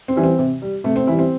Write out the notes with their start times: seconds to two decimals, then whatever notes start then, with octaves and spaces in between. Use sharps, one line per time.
0.08 C4
0.16 E3 G3
0.23 C4
0.39 C3
0.62 G3
0.84 C3 A3
0.96 C4
1.07 E3 G3 E4
1.19 C4